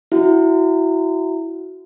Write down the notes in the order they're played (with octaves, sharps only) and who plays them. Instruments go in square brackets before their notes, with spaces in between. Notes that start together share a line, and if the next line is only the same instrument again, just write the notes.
[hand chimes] E4 F#4